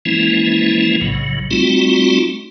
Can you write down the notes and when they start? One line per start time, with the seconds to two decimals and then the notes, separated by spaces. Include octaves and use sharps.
0.05 E3 F3 G#3 A#3 C#4 E4
1.01 B1 A2 C#3 F#3
1.51 G3 A3 C4 D#4 F4 F#4